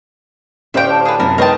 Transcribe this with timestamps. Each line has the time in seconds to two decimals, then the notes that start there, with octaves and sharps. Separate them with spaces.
0.74 D2 A2 C#4 G4 C5 E5 F5 G5
0.91 A5
1.05 G#4 B4
1.20 F#2 C3 E4 A#4
1.38 G#3 B3 D#4 A#4 C#5 G5 A5